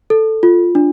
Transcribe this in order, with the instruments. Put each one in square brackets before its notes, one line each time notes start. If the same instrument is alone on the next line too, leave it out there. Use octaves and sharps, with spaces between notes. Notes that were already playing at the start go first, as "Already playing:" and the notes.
[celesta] A4
F4
D4